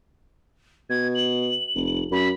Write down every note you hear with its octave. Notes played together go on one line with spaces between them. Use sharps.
B2 G#6
F#7
F1
F#2 B5